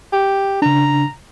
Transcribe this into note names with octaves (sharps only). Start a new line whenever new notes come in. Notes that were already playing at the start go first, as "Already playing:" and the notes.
G4
C#3 D4 A#5